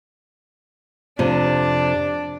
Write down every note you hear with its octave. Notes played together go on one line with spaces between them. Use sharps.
F2 C3 D4 D5